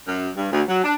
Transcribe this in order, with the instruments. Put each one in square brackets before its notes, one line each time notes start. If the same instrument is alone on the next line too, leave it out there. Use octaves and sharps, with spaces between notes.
[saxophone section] F#2
G2
D2
F#3
D4